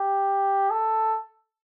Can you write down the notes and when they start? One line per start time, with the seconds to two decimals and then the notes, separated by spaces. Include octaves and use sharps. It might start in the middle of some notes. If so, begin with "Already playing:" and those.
Already playing: G4
0.71 A4